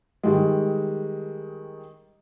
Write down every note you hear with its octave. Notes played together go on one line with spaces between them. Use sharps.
D#3 G3 G#3